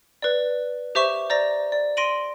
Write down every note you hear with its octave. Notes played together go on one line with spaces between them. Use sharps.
B4 D5
G4 C5 E5 C#6 E7
C5 D5 A#5 A#6
D5
C6 A#6 D7 D#7 F#7